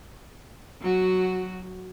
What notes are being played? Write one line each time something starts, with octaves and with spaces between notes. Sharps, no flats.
F#3 F#4